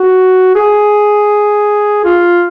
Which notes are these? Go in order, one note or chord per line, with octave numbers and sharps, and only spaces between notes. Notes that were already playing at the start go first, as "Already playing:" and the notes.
Already playing: F#4
G#4
F4